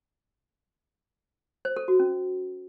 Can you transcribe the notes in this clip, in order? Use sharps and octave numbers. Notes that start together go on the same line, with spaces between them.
C5
A4
F#4
C#4